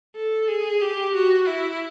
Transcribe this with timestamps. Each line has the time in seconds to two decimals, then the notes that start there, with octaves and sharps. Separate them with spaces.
0.16 A4
0.48 G#4
0.81 G4
1.15 F#4
1.47 E4